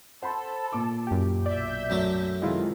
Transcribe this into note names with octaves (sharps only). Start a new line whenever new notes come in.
A4 C5 F#5 B5 C6
A#2 D6
F#2 G4
B1 D5 E5 G6
F#2 A3
A2 C3 D#3 G#3 E4 F4